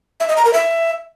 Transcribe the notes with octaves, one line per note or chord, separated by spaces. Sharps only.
E5
D#5
A#5
A#4
E5